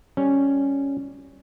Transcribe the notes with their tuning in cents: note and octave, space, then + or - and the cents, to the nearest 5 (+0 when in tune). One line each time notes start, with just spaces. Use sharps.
G3 +0 C#4 +0